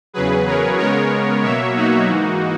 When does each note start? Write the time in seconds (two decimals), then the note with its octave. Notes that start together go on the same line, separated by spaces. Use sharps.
0.14 E2 C#3 F#3 G#4 B4
0.47 A#4 C#5
0.78 C#3 G#3 B3 A#4 C#5
1.43 B2 F#3 A#3 C#5 E5
1.75 D#4 F#4
2.07 G#2 E3 A#3